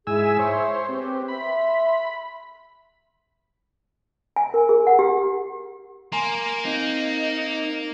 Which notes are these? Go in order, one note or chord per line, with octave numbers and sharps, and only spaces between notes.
G#2 E4 G#4 G#5 E6
C5 C#5
C4 G4 B4
E5 B5 C6
G#5
A#4
G#4
F#5
G4
A#3 G#5 A#5 C6
C4 D#4